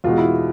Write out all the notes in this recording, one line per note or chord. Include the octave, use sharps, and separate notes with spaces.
E2 B2 G#3 F4
E4